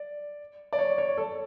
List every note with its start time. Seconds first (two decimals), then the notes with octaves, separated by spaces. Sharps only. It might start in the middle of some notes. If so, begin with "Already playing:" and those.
Already playing: D5
0.73 D5
0.79 C#5
0.98 C#5
1.17 A4